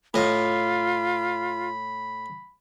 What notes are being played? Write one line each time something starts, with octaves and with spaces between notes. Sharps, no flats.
A2 F4 D#5 B5